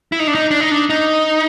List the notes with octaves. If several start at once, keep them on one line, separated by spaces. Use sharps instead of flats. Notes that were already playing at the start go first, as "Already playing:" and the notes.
E4
D#4
D4
D#4
D4
D#4
D4
D#4